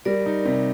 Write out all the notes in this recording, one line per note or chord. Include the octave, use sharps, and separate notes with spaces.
G3 A#4 D5
D#4
C3